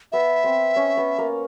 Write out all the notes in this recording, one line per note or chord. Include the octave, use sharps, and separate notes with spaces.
B3 E5
C4
C#4
B3
A#3